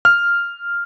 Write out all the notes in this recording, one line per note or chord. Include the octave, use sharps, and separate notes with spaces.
F6